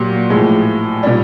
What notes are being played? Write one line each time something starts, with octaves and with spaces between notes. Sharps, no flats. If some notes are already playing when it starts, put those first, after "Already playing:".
Already playing: A#2 F#3 F#4 G4
A2 F3 G#3
A#2 G3